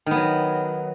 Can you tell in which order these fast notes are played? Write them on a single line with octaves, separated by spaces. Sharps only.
D#3 B3 F#3